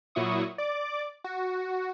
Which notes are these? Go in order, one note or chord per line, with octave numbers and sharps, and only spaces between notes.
A#2 F#3 E4 C#6 D#6
D5 D6
F#4